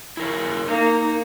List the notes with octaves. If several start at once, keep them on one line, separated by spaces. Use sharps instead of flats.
E4 A#4 C#5
A#3 D#4